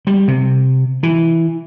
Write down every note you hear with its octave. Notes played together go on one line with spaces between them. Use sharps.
G3
C3
E3